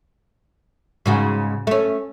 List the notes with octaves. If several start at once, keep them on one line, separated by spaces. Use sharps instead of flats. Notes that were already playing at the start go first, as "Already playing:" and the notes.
G#2 C#3 F#4
A3 C#4